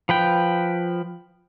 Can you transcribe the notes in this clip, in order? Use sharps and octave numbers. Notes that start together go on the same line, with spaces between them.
F3 B4 G5